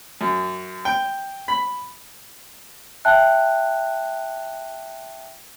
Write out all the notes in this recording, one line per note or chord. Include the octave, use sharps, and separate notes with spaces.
F#2
G5
B5
E5 G5 A5 F#6